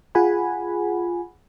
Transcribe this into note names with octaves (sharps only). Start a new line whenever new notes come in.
F4 G#4 F#5 G#5 B5